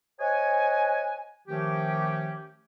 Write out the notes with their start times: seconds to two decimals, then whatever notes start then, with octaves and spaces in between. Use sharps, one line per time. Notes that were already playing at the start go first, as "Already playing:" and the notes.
0.19 C5 C#5 D#5 F#5 G#5
1.48 D#3 F3 A3 C#4 G4